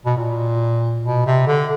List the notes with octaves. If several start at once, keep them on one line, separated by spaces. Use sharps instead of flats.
B2
A#2
B2
C3
D3